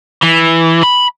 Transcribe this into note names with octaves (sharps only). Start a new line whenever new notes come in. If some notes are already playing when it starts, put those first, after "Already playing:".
E3
B5